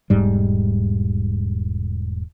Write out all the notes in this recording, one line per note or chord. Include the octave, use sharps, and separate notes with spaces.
E1 G#2 G3